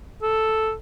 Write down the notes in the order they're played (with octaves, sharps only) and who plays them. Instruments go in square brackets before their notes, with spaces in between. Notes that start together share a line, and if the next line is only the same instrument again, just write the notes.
[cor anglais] A4